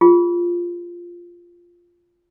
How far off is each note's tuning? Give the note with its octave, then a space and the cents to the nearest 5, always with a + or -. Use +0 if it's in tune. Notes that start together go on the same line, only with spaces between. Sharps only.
F4 -5 G#4 -40